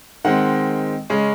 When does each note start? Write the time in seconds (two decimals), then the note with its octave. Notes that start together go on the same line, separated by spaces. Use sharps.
0.24 D#3 G#3 C4 F#5
1.10 C#3 G#3 C#4